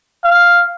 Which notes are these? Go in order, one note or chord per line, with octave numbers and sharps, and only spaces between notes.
F5